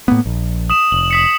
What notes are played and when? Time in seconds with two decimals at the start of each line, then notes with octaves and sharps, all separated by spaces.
0.08 A2 A#3 B3
0.26 A#1
0.70 D#6 E7
0.92 F1 F#7
1.11 D#6 B6 C#7